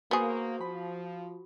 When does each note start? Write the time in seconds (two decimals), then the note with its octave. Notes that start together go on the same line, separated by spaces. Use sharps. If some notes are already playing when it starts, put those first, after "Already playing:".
0.11 A#3 B3 F#4 G#4 C5 D#6
0.60 F3 B5